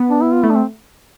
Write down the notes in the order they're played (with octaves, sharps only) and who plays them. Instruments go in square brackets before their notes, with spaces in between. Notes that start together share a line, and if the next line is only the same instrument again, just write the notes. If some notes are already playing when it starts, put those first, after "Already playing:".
Already playing: [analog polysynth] B3
[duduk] D4
E4
F4
[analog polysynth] A3 [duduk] E4
[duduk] D4
C4